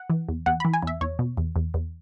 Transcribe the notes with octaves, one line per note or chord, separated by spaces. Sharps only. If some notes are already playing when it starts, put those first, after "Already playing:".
Already playing: F#5
E3
E2
E2 F#5
E3 B5
G#5
E2 E5
E2 C#5
B2
E2
E2
E2